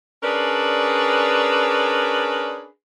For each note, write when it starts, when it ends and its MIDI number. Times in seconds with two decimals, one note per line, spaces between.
0.23 2.66 61
0.23 2.66 62
0.23 2.66 68
0.23 2.66 70
0.23 2.66 71
0.23 2.66 74